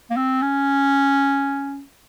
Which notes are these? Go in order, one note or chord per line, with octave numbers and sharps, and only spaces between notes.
A#3
C4
C#4